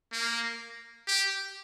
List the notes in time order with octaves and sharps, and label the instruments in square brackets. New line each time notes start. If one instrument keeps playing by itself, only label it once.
[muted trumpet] A#3
G4